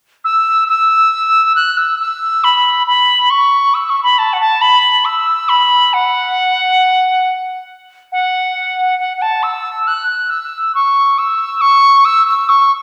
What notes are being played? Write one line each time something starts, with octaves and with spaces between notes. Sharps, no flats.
E6
E6
F#6
E6
E6
B5
B5
C#6
E6
C#6
B5
A5
F#5
A5
B5
E6
B5
F#5
F#5
F#5
F#5
A5
E6
F#6
E6
C#6
E6
C#6
E6
E6
C#6